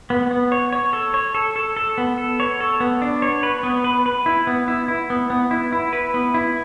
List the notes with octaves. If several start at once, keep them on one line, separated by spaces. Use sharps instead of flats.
B3
B3
C#5
C#5
A4
C#5
A4
A4
A4
B3
A4
C#5
A4
B3
D4
C#5
B4
B3
B4
B4
E4
B3
E4
E4
B3
B3
E4
E4
B4
B3
E4